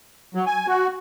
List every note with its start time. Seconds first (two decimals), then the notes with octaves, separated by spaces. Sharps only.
0.35 F#3
0.47 G#5
0.68 F#4